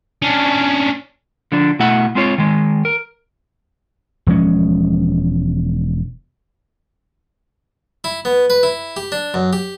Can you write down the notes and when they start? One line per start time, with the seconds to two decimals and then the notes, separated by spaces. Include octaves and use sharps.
0.22 C#4 D4
1.52 D3 F3 D4
1.79 B2 A3 E4 E5 F#5
2.15 G#3 C4 F4 C#5
2.38 D#3 G#3
2.85 A#4
4.27 E1 F3 G#3 C#4
8.04 E4
8.25 B3
8.50 B4
8.63 E4
8.97 G4
9.12 D4
9.34 F#2
9.53 G4